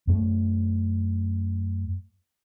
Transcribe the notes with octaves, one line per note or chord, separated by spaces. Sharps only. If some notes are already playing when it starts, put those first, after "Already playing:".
F#2 A3